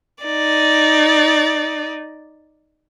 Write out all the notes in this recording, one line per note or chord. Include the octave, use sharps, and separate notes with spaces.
D#4 D5